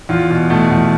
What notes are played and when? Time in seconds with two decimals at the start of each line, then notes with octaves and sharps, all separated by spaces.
0.09 E2 F4
0.30 B2
0.50 B2 A3
0.71 E2